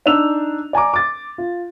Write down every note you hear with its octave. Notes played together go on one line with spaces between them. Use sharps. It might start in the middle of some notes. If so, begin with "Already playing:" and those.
D4 D#4 E6 F7
D5 G#5 A#5 D6
D6 A6
F4